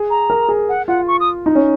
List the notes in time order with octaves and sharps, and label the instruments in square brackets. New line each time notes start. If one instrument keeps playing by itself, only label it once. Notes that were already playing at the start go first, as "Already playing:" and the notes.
Already playing: [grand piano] G#4
[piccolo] A#5
[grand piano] A#4
G#4
[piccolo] F#5
[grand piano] F4 [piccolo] F#5
[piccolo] C#6
D#6
[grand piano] D#4
C#4